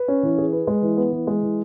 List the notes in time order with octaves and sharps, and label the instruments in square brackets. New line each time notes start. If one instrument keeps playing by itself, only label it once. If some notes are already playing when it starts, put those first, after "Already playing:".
Already playing: [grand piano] B4
C#4
E3
G#4
B4
G#3
E3
B3
E3
G#3
E3